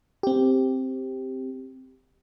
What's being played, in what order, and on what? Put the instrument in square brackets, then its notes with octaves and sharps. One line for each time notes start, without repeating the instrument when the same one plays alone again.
[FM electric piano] C4 G4